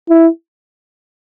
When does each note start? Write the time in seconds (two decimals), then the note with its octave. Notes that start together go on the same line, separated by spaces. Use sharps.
0.09 E4